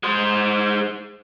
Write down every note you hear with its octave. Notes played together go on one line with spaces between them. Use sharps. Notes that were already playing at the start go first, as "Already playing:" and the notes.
G#3 C5